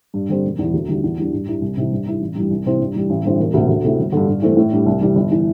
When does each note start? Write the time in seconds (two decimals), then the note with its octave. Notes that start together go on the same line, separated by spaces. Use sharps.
0.14 G2
0.29 D3 G3 C4
0.44 E1
0.59 E2 E3
0.73 D2
0.88 D3 G3 E4
1.03 E2
1.18 E3 G3 D4
1.32 G2
1.47 G3 E4
1.62 C2
1.77 C3 E3
1.92 G2
2.06 G3 E4
2.21 A1
2.35 G2 E3 G3
2.50 C2
2.66 C3 E3 C4 E4
2.80 G2
2.94 E3 G3
3.10 A1
3.24 G2 D3 C4 E4
3.39 E1
3.54 D2 C3 A3
3.68 D2
3.84 C3 A3 E4
3.99 G1
4.12 G2 D3
4.28 G2
4.42 E3 A3 C4
4.57 A2
4.72 G3 D4
4.86 C2
5.01 C3 E3 G3
5.16 G1
5.31 E3